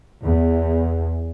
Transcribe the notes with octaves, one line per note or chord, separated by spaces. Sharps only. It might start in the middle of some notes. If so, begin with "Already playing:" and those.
E2